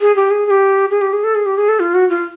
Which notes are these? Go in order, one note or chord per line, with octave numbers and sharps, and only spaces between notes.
G#4
G4
G#4
G#4
G4
G#4
G4
G#4
A4
G#4
G4
G#4
A4
F4
F#4
F4